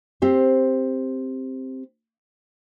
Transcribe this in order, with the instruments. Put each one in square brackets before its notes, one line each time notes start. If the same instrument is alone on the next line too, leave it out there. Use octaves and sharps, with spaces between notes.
[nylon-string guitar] C4 G4 C5